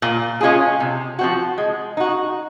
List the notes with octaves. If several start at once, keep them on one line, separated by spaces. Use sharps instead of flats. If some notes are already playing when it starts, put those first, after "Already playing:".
A#2
G#3 C#4 F4 G#4
C3
F3 C4 F#4
G#3
D#4 F#4